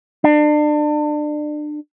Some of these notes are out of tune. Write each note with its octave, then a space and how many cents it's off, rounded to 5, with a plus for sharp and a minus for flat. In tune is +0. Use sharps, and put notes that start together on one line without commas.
D4 +30